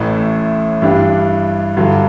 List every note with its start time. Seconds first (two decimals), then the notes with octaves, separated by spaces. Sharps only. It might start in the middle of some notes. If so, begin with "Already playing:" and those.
Already playing: A1 A2 E3
0.82 G2 E3 G3 D4
1.77 G2 D3 F#3